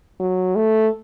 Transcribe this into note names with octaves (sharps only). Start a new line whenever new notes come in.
F#3
A3